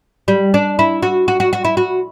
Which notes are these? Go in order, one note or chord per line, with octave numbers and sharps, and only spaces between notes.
G3
D4
E4
F#4
F#4
F#4
F#4
E4
F#4